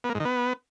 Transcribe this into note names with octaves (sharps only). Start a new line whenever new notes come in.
B3
A#3
G#2
D#3
B3